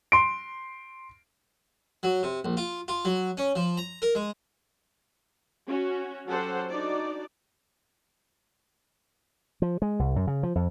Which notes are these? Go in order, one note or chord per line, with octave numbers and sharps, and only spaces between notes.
C6 D7
F#3
C3
A#1
F4
F4
F#3
C#4
F3
A#5
A#4
G#3
C#4 F#4
F#3 C#4 G4 A4 C5 F#5
D4 D#4 F#4 D5
F3
G#3
C2
F#2
C#3
F3
F2